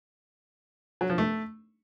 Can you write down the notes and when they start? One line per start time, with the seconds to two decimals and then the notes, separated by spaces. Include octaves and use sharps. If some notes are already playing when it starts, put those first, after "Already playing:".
1.01 F#3
1.09 F3
1.18 A3